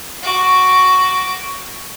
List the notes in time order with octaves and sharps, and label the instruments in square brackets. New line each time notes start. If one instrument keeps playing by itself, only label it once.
[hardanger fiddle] F#4 D6